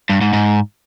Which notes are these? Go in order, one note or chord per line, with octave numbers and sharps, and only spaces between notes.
G2
G#2
G#2